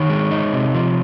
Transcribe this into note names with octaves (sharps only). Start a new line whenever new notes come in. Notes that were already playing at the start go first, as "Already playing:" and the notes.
Already playing: D#3 C#5
G#3
D#4
C3
F3